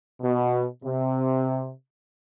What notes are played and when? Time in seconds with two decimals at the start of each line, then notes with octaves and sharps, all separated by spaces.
0.21 B2
0.84 C3